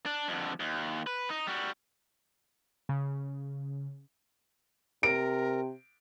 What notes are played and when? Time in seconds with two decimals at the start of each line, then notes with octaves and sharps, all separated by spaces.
0.06 D4
0.28 F2 D3
0.60 D#2
1.07 B4
1.30 D#4
1.48 G3 F#4
2.89 C#3
5.03 C3 A#4 D7